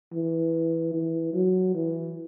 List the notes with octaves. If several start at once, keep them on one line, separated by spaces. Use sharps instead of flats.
E3
E3
F#3
E3